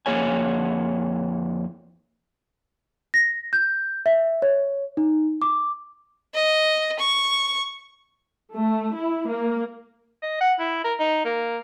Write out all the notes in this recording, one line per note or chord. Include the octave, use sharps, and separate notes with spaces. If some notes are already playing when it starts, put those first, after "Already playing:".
F2 A#3 G#4 C#5 G#5
A#6
G6
E5
C#5
D#4
D6
D#5
C#6
A3
E4
A#3
D#5
F#5
E4
A#4
D#4
A#3